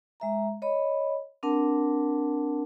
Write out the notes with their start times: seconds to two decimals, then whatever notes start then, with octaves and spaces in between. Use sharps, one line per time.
0.20 G#3 E5 A#5
0.62 C#5 D#5 B5
1.43 C4 D4 A#4 F#5 A5